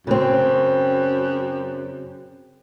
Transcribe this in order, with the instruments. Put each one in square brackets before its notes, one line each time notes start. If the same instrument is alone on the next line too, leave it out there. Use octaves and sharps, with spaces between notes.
[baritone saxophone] F#2 [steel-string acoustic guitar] C#3 C4